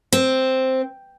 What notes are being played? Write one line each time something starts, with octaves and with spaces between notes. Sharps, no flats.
C4